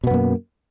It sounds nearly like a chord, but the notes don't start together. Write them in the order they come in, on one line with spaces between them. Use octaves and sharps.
B2 B3 F#2 A#3